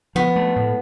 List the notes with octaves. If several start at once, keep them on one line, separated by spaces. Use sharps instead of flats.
F3 B3
A3
A2